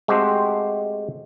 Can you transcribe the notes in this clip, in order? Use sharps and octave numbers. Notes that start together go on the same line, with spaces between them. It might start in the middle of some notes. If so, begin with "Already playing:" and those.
G#3 A3 C4 F#4 G4 C5